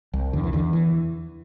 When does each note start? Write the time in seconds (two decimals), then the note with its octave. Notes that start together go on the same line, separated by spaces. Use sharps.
0.13 C2
0.33 E2 D3
0.44 E3
0.53 E2 D3
0.73 E3